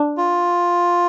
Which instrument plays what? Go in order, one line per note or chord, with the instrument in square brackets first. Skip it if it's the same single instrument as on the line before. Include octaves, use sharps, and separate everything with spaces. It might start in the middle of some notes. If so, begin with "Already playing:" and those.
Already playing: [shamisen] D4
[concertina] F4